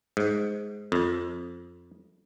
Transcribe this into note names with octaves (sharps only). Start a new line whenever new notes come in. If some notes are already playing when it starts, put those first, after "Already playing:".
G#2
F2